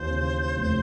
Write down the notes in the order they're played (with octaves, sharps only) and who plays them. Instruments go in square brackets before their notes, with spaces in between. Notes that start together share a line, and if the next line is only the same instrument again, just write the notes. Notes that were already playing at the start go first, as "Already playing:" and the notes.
Already playing: [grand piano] D#2 E3 [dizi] C5
[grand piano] C#3
F1